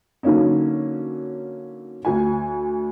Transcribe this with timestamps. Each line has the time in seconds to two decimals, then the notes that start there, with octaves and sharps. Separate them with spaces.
0.23 D3 F#3 A#3 C#4 D#4
2.05 D2 G#5